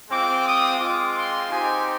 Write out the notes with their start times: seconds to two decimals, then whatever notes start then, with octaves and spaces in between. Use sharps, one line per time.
0.10 G#3 C4 F4 D6
0.46 D#6
0.80 G#3 C4 F4 D6
1.16 C6
1.51 C4 D#4 G4 G#5